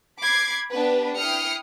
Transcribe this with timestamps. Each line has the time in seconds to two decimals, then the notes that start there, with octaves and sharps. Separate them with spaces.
0.21 B5 D6 G#6 C7
0.71 B3 D4 G4 B4
1.18 E4 G5 D#6 F6 C7 C#7